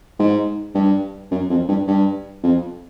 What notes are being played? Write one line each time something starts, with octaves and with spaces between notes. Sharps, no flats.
G#2
G2
F#2
F2
G2
G2
F2